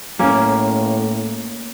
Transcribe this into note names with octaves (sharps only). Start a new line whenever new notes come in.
A2 A#3 C#4